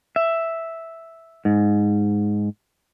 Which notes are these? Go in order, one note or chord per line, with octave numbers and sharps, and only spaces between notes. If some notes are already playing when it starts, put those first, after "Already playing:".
E5
G#2